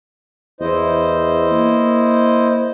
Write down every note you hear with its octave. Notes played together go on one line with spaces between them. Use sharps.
E2 E4 C5 D#5
A#3